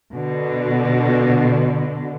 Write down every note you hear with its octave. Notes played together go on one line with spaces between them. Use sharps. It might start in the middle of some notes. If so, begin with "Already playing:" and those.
B2 D3